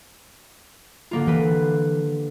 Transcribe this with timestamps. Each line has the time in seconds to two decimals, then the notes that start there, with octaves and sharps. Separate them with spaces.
1.11 D3 A#3 F4
1.27 E3 G4 B4